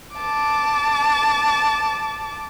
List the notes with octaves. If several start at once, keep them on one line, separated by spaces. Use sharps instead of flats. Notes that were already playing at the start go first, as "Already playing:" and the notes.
A5 D6